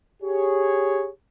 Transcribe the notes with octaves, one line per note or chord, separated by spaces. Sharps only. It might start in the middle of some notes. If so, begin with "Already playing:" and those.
G4 G#4 C#5